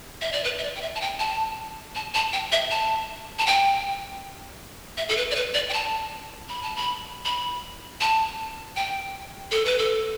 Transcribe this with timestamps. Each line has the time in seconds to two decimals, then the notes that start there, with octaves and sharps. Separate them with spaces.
0.22 E5
0.32 D5
0.44 B4
0.58 E5
0.64 D5
0.76 G5
0.82 E5
0.95 A5
1.01 G5
1.19 A5
1.95 A5
2.14 A5
2.33 G5
2.52 E5
2.71 A5
3.39 A5
3.46 G5
4.98 E5
5.09 A4
5.17 B4
5.31 D5
5.35 B4
5.55 D5
5.69 G5
5.73 A5
6.49 B5
6.63 A5
6.76 B5
7.25 B5
8.01 A5
8.76 G5
9.52 A4
9.65 B4
9.78 A4